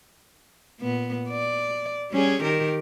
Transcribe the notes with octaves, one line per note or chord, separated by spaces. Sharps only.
A#2 B3
D5
G3 C#4 G#4
D#3 G4 A#4